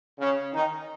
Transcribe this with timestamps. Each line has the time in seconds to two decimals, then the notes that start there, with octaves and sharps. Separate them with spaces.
0.19 C#3 C#4
0.53 D#3 D#4